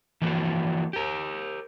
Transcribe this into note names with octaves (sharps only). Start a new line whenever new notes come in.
E3 F3 A#3 F#4
G4 A#4